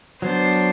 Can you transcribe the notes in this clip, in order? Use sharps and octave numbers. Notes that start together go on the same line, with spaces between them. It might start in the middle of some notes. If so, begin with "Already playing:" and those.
F#3 B3 D4 C5